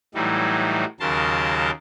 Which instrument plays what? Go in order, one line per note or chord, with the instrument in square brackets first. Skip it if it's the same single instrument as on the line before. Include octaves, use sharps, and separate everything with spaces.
[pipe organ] A2 E3 F#3 G3 D#4
D#2 C#3 F#3 A#4 A5 C6